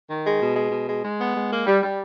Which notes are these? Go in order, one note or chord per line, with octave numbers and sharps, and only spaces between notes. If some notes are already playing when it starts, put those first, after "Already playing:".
D#3
G#3
B2
G#3
B2
G#3
G#3
B3
G#3
A#3
G3
G3